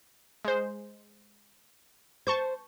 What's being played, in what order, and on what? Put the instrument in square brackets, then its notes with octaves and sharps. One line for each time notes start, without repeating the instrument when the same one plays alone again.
[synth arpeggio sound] G#3 C5
[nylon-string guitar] C5 [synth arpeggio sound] A5 C#6 G6